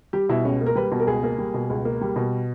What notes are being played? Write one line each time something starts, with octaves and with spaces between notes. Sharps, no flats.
G3 G4
B2 E4
C#2 C#4
A#3
A#4
G3 B4
B2
A#4
C#2 G#4
A#3
G3
B2
C#2
A#3
G3
B2